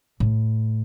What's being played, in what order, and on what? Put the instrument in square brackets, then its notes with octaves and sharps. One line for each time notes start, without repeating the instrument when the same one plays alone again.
[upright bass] A2